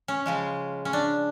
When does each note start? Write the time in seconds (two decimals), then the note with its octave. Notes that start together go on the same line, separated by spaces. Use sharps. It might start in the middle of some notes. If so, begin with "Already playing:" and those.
0.08 C#4
0.26 C#3 F3 G#3
0.85 C#4
0.93 D4